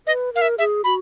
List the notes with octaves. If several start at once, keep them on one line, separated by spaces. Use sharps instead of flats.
B4 D#5
A#4 F5
E5
G#4 E5
F#4 B5